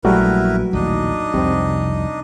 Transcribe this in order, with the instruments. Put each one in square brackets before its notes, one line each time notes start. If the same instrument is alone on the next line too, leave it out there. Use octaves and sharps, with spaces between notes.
[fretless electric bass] A#1 [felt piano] F#3 [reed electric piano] G3 A3 F#4 [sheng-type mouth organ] E4 A#4 B4
[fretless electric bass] A#1 D#2 A2 [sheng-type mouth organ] D4 D#4 D#5
[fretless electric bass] C2 F2 [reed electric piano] C3 C4